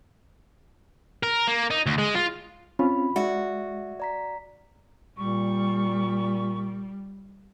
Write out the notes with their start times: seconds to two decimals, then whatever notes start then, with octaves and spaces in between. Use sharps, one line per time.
1.23 A#4
1.47 A#3
1.70 D#4
1.86 D2
1.98 G#3
2.15 F4
2.79 C4 C#4 F4 B5
3.16 G#3 F#4 D5 E5
4.00 D5 A#5 B6
5.17 A#2 G3 C#6